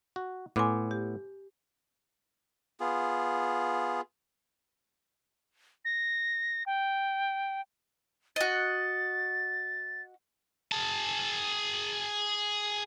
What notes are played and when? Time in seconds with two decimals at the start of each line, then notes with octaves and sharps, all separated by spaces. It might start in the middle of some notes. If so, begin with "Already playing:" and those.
0.16 F#4
0.56 A2 B3 G#5 C6 D6
0.91 G4
2.80 B3 F4 G#4
5.85 A#6
6.66 G5
8.36 F#4 D#5 A6
10.72 G#4 A5